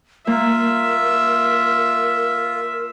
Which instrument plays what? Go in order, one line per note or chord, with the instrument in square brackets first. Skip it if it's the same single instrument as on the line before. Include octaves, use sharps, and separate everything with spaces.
[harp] A#3 [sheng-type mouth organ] F4 [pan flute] A#4 [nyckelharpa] E5